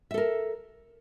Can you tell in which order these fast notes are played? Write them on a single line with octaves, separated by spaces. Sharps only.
E5 A4 A#4